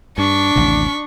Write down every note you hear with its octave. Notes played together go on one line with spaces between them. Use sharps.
G2 D4 C#6 B6
A1 D#2 C3